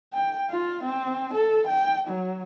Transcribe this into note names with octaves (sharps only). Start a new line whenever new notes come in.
G5
F4
C4
A4
G5
F#3